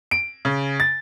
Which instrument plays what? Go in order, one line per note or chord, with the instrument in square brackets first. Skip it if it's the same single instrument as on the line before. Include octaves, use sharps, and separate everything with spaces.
[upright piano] D7
C#3
A6